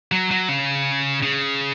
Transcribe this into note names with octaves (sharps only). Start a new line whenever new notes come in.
F#3
F#3
C#3
C#3